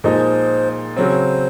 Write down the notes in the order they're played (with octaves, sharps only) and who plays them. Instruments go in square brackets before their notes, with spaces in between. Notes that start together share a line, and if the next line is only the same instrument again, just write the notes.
[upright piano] A#2 F3 G#3 D#4 [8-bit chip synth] C5
[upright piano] C#3 F#3 C4 [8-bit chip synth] C5